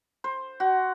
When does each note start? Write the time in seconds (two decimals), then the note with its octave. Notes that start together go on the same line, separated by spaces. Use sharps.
0.24 C5
0.60 F#4